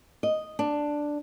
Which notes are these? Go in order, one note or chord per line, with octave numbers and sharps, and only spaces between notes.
D#5
D4